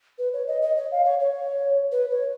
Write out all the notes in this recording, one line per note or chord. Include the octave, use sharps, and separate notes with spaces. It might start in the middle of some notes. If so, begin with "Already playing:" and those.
B4
C#5
D#5
D#5
C#5
F5
C#5
C#5
B4
C#5